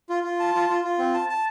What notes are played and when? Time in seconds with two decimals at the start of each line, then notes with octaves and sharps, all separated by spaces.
0.09 F4
0.23 F4
0.40 A5
0.54 F4
0.70 F4
0.84 F4
0.98 C4
1.14 A5
1.29 A5